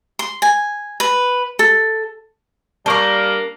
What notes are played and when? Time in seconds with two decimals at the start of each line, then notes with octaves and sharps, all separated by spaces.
0.19 C6
0.42 G#5
1.00 B4
1.59 A4
2.86 G3 A#3 D4 A#4 A5 C#6 D6